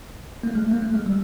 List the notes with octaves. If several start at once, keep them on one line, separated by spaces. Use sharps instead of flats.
A#3
A3
G#3
A3
A#3
A3
G#3
G3